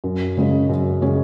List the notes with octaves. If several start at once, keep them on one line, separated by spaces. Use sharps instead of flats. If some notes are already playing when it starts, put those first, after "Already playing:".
F#2
C#3 G#3 C#4 G#4
F#2
C#3 G#3 C#4 G#4